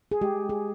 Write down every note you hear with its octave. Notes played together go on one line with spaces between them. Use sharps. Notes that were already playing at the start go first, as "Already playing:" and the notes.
G#4
G#3 G4
G#4